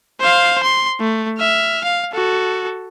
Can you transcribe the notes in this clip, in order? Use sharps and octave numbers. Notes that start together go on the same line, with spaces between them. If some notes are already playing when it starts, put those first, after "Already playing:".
C5 F5
C6
A3
E5 F6
F5
F#4 A4